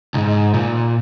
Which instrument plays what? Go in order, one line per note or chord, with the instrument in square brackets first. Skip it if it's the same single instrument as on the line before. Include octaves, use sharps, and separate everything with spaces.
[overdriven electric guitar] C2 G#2
A#2